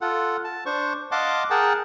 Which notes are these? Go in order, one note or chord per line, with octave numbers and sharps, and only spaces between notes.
F4 A4 F#5
A5
D4 C5 C#6
D#5 F5 F#5 A5 C6 D6
G#4 A#4 F#5 G5 A5